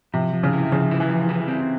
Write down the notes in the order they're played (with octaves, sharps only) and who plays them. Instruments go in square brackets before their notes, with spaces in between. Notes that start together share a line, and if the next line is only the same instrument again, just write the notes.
[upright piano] C3 [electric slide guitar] F3
[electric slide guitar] F3
[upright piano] C#3
[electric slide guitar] E4
[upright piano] C#3 [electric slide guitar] F3
[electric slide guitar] E4
[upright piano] E3
[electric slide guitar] F3
E4
C4